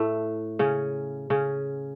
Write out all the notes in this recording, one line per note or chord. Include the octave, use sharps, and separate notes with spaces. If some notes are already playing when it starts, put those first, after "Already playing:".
Already playing: A2 A3
C#3 C#4
C#3 C#4